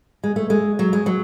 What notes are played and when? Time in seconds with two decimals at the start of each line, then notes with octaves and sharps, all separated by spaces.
0.24 G#3
0.36 A3
0.50 G#3
0.79 F#3
0.93 G#3
1.06 F#3